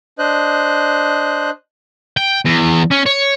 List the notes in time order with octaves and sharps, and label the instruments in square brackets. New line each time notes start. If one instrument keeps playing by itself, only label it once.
[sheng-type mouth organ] D4 C5 D#5 F#6
[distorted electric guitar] G5
E2
C#4
C#5